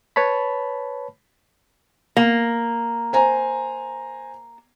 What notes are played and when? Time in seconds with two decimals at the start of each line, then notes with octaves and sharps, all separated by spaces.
0.16 B4 C#5 A5 B5
2.17 A#3
3.13 C5 G#5 A#5